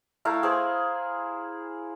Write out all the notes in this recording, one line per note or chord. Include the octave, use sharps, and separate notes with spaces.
A3 E4 A#4 F5
G#4 C5